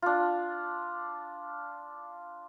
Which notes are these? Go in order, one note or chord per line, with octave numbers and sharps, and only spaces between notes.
D4 F4